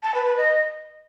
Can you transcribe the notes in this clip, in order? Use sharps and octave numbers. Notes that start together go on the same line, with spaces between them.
A5
B4
B4
D#5